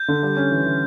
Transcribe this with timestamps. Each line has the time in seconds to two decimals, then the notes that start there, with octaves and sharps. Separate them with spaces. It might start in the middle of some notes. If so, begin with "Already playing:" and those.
Already playing: G6
0.08 D3
0.23 G3
0.36 C#4
0.52 E3
0.65 E3